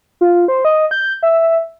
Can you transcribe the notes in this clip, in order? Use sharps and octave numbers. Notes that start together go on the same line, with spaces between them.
F4
C5
D#5
G6
E5